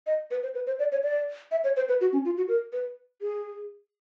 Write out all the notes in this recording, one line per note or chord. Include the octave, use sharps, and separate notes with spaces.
D#5
B4
C5
B4
C5
D5
C#5
D5
E5
C#5
C5
B4
F#4
C#4
F4
F#4
A#4
B4
G#4